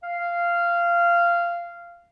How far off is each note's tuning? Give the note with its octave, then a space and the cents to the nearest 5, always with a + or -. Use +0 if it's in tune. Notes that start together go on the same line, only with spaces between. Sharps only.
F5 -15